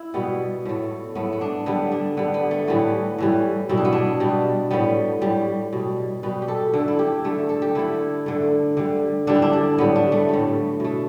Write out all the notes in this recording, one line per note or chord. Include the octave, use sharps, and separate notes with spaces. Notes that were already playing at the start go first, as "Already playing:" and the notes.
Already playing: E4
B2 G3 B3
A2 A3
A2 A3 B3
B3
D4
D3 G3 B3
D4
D3 G3 B3
B3
A3
A2 E3 G3 B3
A2 E3 G3
B2 G3 E4
D4
B3
D4
B2 G3
A2 G3 B3
A2 G3
B2 G3
B2 G3 B4
G4
A4
D3 A3 A4
E4
G4
D3 A3
A4
G4
D3 A3 E4
D3 A3
D3 G3
D3 G3 D4
E4
D4
D4
A2 G3 B3
D4
A3
A2 G3
B2 A3